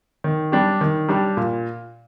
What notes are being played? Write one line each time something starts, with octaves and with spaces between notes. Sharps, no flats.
D#3
G3 D4 G4
D#3
G3 D4 G4
A#2